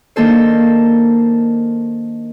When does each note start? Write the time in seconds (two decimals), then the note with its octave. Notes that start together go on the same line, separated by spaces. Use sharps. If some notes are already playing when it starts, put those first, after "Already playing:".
0.16 D#3 A#3 D4 A4 C5